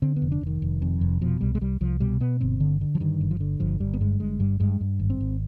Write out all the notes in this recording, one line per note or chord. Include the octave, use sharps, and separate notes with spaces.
D3 C4
B3
F1
D4
F1
D#3
F1
F2
F1
B2 F3
C2 G3
G#3
C2 G3
C2 F3
B2 G3
B2 B3
G1 C4
D3
D3
F3
G2 D#3
G1
F3
D3
G1 F3
G1 G3
B3
G2 G#3
G1 G#3
G2 G3
G2 G#3
G2
G#1
C4
G#1